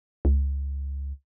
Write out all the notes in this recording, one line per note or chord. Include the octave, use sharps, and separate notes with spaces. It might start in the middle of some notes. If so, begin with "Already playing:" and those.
C#2